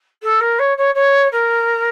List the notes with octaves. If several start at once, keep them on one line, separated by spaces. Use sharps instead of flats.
A4
A#4
C#5
C#5
C#5
A#4